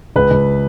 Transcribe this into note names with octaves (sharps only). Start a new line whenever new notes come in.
C#2 B4
C#2